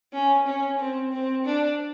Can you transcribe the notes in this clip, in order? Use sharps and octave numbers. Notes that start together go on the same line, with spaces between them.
C#4
C#4
C4
C4
D4